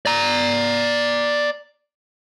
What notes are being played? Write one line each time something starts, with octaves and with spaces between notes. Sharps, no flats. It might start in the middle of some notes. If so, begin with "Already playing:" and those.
D5 A#5